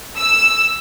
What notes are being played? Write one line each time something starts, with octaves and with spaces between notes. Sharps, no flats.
E6